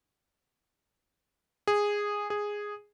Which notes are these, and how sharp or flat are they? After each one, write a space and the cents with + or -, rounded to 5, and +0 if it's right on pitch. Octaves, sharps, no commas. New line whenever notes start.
G#4 -10
G#4 -5